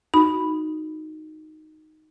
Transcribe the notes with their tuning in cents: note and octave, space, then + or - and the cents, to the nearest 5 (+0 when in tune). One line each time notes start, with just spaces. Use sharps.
D#4 +0 F#4 -5 B5 +0